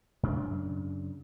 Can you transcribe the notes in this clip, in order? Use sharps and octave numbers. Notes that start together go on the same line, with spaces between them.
F#2 C#3 D4